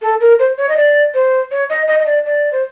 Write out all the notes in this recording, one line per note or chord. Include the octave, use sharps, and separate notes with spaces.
A4
A#4
C5
C#5
D#5
D5
C5
C#5
D#5
D#5
D#5
D5
D5
C5